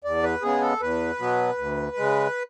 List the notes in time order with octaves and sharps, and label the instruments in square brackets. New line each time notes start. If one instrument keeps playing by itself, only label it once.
[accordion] E2 D5
B4
C#3 G#3 B3 G#4
A4
E2 B4
B2 F#3 B3
D2
C#3 G#3